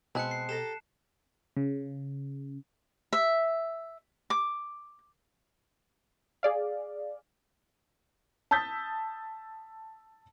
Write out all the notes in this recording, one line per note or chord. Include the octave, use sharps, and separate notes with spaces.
B2 G#3 C4 B4 A5 F#6 C#7
C7
G4 A4 A#5 E7
C#3
E5
D6
G#4 D5 F5
A5 D#6 E6 G6 A6 B6